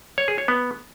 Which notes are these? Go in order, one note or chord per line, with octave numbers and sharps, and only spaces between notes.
C#5
G#4
C#5
B3